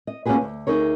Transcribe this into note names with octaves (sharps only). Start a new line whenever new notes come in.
D#5
A#3 C#4 F4 F#4 G#4 B4
D2
D2 D#4 G#4 A#4 C#5